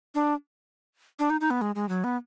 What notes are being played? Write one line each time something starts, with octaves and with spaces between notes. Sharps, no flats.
D4
D4
D#4
D#4
B3
G#3
G#3
F#3
B3